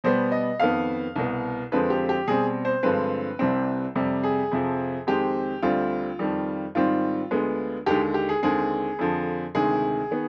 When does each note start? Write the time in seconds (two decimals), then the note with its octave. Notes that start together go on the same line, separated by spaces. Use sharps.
0.04 B2 G3 B3 C5
0.32 D#5
0.60 F2 D#3 B3 F5
1.16 C2 B2 B3
1.72 F2 D3 F3 G#3 C4 B4
1.90 G4
2.09 G4
2.28 B2 G3 C4 G#4
2.65 C5
2.83 G2 D3 F3 G#3 C4 B4
3.39 C2 C3 G3 C4
3.96 F2 C3 G3
4.23 G#4
4.51 F2 C3 F3
5.07 F2 D#3 G#3 C4 G4
5.62 D2 D3 G3 C4 F4
6.19 F2 D#3 G3
6.75 G#2 D#3 G3 C4 F4
7.31 D2 D3 G#3 B3
7.86 D#2 D3 G#3 G4
8.14 G4
8.29 G#4
8.43 D#2 D3 G#3 C4 G#4
8.99 F2 D3 F3
9.55 D2 C3 D#3 G#3 G#4
10.11 D#3 B3